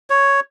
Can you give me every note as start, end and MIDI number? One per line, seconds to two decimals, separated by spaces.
0.10 0.40 73